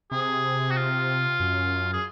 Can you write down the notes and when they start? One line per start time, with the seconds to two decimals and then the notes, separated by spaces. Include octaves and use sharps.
0.12 C3 G#4
0.71 F#4
0.76 F4
1.40 F#2
1.93 G#4